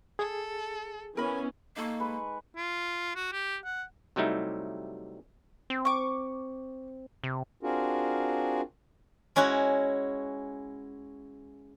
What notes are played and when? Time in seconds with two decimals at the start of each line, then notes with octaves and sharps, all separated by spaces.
0.19 G#4 A4
1.17 E3 B3 C#4 A#4 G#5 B5
1.77 A#3 D#4 A4 C#6
2.00 G#3 B4
2.56 F4
3.16 F#4
3.32 G4
3.65 F#5
4.16 C3 F#3 G3 A3 D#4 E4
5.70 C4
5.85 C#6 D6
7.24 C3
7.63 C4 D4 F4 F#4 G#4 A#4
9.36 G#3 C#4 E4 F#4